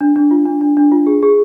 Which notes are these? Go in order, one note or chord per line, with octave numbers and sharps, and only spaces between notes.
D4
D4
F4
D4
D4
D4
F4
G#4
G#4